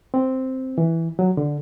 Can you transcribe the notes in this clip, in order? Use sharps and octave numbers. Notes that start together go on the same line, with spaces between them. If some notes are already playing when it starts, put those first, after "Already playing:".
C4
E3
F#3
D3